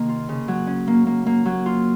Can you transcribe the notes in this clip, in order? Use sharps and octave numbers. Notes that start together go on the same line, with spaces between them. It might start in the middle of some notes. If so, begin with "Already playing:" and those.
Already playing: C3 D#3 A#3
F4
C#3
F#3
C#4
A#3
A#3
A#3
F#3
F4